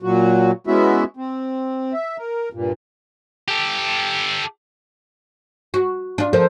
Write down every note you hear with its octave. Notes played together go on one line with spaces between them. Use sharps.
A#2 F#3 F#4
G#3 B3 C#4 E4 F#4 E5
C4
E5
A#4
G2 A#2
G4 A4
F#4
D4 F4
F3 A4 A#4 C5